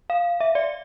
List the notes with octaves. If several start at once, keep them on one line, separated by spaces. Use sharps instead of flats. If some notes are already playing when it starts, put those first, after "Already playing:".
F5
E5
D5